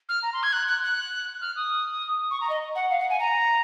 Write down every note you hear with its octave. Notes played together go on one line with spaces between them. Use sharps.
F6
A#5
C6
G#6
F#6
F#6
F#6
F6
D#6
C#6
A#5
D#5
F#5
F5
F#5
G#5
A#5